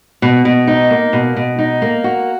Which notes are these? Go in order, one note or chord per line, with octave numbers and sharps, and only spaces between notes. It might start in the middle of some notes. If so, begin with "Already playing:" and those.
B2
B2
D#4
A#3
B2
B2
D#4
A#3
F#4